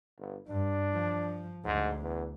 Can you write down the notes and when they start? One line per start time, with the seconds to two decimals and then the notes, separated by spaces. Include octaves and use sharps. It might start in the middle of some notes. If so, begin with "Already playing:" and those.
0.19 G1
0.48 G2 D4
0.93 F3
1.65 D2 G#2
2.02 E2